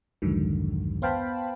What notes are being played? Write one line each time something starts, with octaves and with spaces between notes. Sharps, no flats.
C2 F2 G#2 D3 D#3 F#3
B3 C5 F5 G5 A5 B5